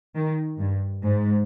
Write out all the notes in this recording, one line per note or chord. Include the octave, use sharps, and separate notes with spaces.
D#3
G2
G#2